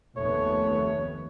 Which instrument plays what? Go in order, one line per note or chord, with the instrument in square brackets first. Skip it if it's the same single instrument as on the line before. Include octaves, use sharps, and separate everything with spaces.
[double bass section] F1 D#2 B3 [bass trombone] A3 [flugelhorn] C#5